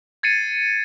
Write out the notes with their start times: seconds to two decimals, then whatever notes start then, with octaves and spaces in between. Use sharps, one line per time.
0.23 G#6 A6 C7 C#7 D#7